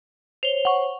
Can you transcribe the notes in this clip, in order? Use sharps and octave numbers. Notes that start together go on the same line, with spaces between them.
C5 C#5 F7 G7
F#5 C#6